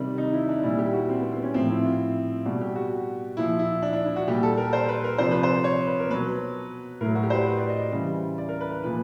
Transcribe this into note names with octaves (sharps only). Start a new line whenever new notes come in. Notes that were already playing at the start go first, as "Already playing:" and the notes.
Already playing: C3 D#3 G3 D4
D#4
E4
D4
A#2 G3 E4
G4
F#4
C4
B3
C4
C#4
A2 F3 C4
E4
F4
B2 G3 F#4
G4
F#4
A#2 F3 E4
E4
D4
D4
E4
F#4
A#2 G3 G4
A4
A#4
C5
B4
A#4
C3 F3 C5
B4
C5
C#5
B4
A#4
B2 F#3 B4
A2 F#3 A#4
F#4
G4
C5
B4
B4
D5
D#5
D5
C#3 E3 G3
D5
A#4
B4
B4
A#2 F3 B4